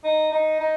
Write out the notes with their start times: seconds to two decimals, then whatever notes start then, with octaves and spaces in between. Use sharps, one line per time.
0.04 D#4
0.32 D#4
0.61 D#4